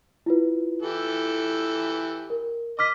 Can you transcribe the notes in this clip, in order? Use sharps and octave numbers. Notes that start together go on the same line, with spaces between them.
E4 F4 B4
E3 G4 A4
A#4
D#5 D6 F6 B6